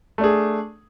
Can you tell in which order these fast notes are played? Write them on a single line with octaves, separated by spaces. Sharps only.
A3 D4 G#4